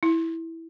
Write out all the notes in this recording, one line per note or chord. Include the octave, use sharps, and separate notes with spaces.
E4